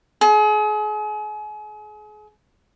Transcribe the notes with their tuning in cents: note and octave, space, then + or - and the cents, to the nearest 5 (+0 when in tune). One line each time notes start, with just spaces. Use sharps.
G#4 +35